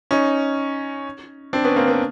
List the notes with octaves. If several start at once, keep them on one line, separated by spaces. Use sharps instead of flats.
C#4 D#4
C4 D4
B3 C#4
A#3 C4
B3